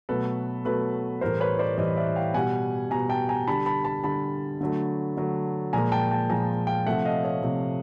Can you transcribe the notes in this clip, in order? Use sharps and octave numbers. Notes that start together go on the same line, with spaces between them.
B2 F#3 A3 A4 B4
B2 F#3 A3 A4 B4
A2 E3 G3 A#4 C5
B4 C#5
C5 D5
A2 E3 G3 C#5 D#5
D5 E5
F5 G5
B2 G3 F#5 G#5
B2 G3 G#5 A#5
G5 A5
G#5 A#5
D3 G3 A5 B5
A5 B5
A5 B5
D3 G3 A5 B5
D3 F#3 A3
D3 F#3 A3
A#2 F3 G#3 G#5 A#5
G5 A5
G5 A5
A#2 F3 G#3 G#5 A#5
F5 G5
C3 F3 A3 E5 F#5
D#5 F5
C#5 D#5
C3 F3 A3